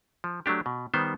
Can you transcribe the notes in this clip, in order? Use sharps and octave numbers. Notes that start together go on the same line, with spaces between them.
F3
F#3 A3 D4 G4
B2
D#3 G3 B3 C5